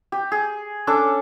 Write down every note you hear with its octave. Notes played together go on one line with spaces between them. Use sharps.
G4
G#4
C#4 D4 A4 D6